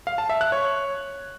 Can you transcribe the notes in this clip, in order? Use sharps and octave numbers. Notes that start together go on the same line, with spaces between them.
F5
A5
E5
F#6
C#5